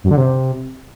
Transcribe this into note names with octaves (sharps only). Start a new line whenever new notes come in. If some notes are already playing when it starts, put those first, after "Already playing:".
F#2
D3
C3